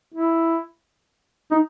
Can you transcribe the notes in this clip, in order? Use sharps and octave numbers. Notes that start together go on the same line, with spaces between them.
E4
D#4